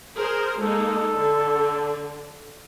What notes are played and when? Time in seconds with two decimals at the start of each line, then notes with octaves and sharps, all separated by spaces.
0.17 G#4 A#4 C5
0.59 G#3 A#3 D#4 A4
1.16 D3